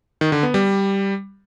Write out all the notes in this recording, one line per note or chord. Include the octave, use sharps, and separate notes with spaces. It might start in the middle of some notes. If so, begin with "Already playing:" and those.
D#3
D3
B3
G3